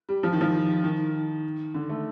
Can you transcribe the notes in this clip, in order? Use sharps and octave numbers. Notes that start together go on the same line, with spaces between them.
G3
F3
D#3
F3
D#3
D3
A3